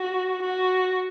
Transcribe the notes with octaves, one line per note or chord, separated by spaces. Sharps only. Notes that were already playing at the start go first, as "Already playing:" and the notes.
Already playing: F#4
F#4